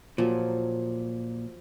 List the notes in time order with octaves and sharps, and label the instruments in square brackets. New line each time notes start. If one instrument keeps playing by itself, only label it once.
[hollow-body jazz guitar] A#2 [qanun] F3 F#3